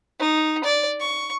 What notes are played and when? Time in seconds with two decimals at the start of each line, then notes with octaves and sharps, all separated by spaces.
0.19 D#4
0.64 D5
1.00 C#6